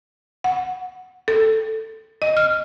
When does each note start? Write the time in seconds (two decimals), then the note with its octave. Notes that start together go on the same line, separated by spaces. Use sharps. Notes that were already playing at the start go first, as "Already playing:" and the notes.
0.44 F#5
1.28 A4
2.22 D#5
2.37 F6